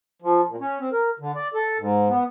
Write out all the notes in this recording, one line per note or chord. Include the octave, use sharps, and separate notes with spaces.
F3
A#2
C#4
C4
A#4
D3
D5
A4
G#2
B3